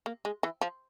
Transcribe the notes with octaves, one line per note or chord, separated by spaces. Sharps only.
A#3
G#3
E3
F3